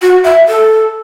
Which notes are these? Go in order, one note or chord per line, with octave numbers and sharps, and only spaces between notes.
F#4
E5
A4